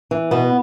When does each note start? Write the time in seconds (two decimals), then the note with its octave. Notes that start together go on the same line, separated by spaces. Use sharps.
0.11 E3
0.31 B2 B3